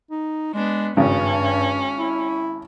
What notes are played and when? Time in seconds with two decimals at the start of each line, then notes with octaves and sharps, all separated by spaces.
0.11 D#4
0.54 G#3 B3 D4
0.97 G#1 G2 C#3 C#4
1.99 E4